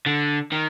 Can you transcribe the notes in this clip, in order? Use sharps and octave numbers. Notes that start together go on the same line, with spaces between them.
D3
D#3